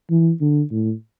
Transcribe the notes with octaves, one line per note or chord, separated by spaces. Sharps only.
E3
D3
A2